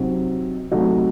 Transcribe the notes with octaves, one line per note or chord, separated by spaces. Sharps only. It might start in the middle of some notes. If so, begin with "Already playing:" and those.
Already playing: C3 F#3 C4 D#4
C3 F#3 A3 D#4 F#4